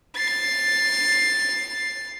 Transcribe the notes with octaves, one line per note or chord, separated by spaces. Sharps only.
A6 C7